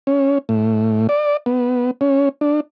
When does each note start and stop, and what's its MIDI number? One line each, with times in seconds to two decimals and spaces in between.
0.07 0.38 61
0.49 1.07 45
1.09 1.37 74
1.46 1.91 59
2.01 2.29 61
2.41 2.60 62